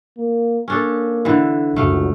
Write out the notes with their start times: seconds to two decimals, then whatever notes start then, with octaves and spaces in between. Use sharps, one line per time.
0.17 A#3
0.68 A#3 C#4 D4 A4
1.25 D3 E3
1.76 F#1 C#2 A3 F#4 F5